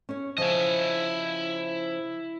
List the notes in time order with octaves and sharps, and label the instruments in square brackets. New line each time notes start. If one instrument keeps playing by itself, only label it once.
[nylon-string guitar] C#4 C#5
[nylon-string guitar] C#3 F3 [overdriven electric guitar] E4 D#5